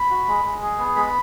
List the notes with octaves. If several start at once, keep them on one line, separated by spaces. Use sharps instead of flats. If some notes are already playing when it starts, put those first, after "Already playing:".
Already playing: B5
F#4
G#3
G#3
G#4
B3
G#3 B5